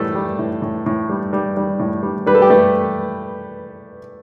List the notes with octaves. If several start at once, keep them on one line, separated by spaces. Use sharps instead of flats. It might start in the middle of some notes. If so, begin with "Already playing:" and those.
Already playing: A2 G3 A3 A4
G3
A2
A2
A2
G3
G3
G3
A2
G3
G3 B4
A4
G4
G3 A3 A4